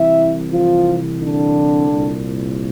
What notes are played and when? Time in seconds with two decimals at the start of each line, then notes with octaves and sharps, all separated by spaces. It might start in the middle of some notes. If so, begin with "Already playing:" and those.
Already playing: C2 C3 E3 E4 E5
0.52 F3 F4
1.20 D3 D4
1.90 C2 A#2